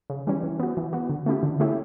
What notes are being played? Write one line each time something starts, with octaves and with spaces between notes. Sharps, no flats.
C#3
E3 G3 C#4
E3
B3 F#4
E3
B3 F#4
D3
A3 C#4 E4 G4
D3
A3 C#4 E4 G4